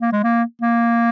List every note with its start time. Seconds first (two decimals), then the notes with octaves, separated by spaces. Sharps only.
0.01 A#3
0.12 G#3
0.23 A#3
0.62 A#3